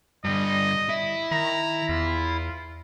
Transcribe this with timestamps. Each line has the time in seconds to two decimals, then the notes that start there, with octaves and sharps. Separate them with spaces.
0.25 G2 D3 G3 D#5
0.89 E4
1.31 D#3 A#5
1.89 E2 F4